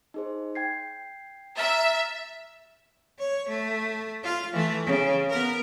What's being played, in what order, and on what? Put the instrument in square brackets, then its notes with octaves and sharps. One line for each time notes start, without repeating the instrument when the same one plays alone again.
[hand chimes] D#4 G#4 C5
G5 G#6 C7
[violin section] E5 [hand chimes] A#5 F6 A6
[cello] C#5
A3
F4
E3 A3
C#3
B3 A#4